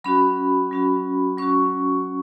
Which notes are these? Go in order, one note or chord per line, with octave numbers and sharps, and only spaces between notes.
F#3 C#4 F#4 B5
F#3 C#4 F#4
F#3 C#4 F#4 C#6